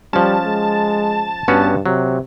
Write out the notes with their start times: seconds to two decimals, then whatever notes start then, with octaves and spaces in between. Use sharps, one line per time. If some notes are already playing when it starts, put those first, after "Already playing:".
0.13 F3 G3 C#4 A5
0.46 G#3
1.48 G2 B3 C#4 F#4
1.86 C3 F#3